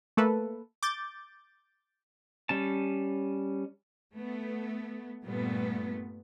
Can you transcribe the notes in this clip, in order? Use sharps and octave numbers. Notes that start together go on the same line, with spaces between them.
A3 A#3 A4 B4
D6 G6 A6
G3 C#4 A5
A3 B3
G2 A#2 G3 A3 B3